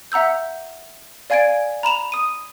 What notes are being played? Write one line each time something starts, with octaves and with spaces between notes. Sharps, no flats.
E5 F#5 A#5 E6 G6
D5 F5 G#5 G#6 A6 D7
A#5 B5 E7 F7
D#6 D#7